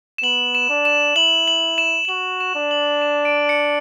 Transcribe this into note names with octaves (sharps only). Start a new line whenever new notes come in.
E7
B3 F#7
E7
D4
E7
E4 F#7
F#7
E7
E7
F#4 F#7
E7
D4
F#7
E7
D7
C#7